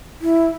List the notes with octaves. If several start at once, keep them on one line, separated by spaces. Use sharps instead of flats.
E4